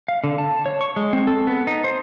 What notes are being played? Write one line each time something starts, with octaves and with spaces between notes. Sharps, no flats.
F5
D3
A5
C#5
C#6
G#3
C4
A4
B3
D#4
C5